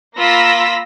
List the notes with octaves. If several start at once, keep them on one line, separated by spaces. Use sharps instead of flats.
A#3 F4 B5 E6 A#6 B6